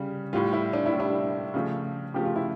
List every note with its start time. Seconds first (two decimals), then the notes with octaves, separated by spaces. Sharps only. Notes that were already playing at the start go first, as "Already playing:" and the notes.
Already playing: C#3 G3
0.33 A2 G3 F4
0.53 E4
0.73 D4
0.86 E4
0.93 A2
0.98 G3 D4
1.54 C#3 F3 A3
2.14 C#3 F3 A3 G4
2.25 F4
2.36 E4